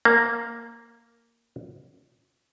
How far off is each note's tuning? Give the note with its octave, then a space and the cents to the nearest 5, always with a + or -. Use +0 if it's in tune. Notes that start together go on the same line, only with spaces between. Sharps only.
A#3 -5